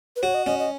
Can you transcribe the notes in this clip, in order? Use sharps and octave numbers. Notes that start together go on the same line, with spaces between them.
B4
F#4 C#5
D#5
C#4 D#5
D#5